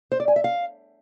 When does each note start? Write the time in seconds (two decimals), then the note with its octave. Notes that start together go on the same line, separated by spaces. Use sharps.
0.12 C5
0.20 D5
0.28 G#5
0.36 E5
0.44 F5